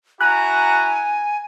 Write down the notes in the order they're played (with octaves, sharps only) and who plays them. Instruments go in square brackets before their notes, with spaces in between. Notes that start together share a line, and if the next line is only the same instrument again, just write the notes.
[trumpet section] E4 F#4 A#5 [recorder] G#5 [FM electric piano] F#6